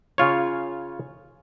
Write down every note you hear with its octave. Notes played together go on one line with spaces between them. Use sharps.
C#3 F4 C#5